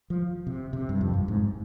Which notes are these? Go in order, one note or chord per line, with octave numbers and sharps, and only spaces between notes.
F3
C3
C3
G2
F2
G2
G#2